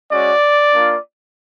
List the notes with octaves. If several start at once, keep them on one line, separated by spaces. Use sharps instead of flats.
G#3 C#4 F#4 D5
A#3 D4 F4